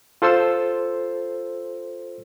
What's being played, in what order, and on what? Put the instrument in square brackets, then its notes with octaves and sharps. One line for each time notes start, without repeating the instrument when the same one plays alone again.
[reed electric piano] F4 A4 C5 C6 E6